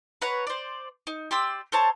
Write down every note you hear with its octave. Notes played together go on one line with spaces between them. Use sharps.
B4 C#5 F#5 A#5
C5 D5
D#4
G4 D5 C6 E6
A4 C5 C#5 A5